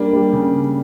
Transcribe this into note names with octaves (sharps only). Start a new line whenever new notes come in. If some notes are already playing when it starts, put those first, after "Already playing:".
Already playing: G3 A#3 D4
G3
C#3